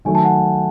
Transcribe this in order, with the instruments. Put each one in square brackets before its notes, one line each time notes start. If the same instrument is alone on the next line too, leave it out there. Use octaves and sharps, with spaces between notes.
[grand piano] D#3 F#3 A3 [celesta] G#5
[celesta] A5
F#5 G#5